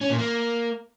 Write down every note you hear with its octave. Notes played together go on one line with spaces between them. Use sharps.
C#4
A#2
A#3